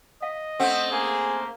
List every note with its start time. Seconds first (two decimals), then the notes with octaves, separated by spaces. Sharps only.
0.22 D#5 F5
0.60 A3 C4 C#4 F#5
0.92 A#3 G#4